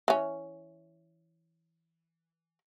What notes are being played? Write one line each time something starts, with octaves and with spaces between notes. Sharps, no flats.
E3 C#4